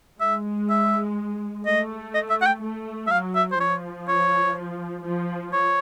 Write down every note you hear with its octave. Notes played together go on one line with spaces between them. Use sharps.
G#3 E5
E5
A3 D#5
D#5
E5
F#5
G5
A3
E5
F#3 F5
E5
C5
F3 C#5
C#5
F3
C#5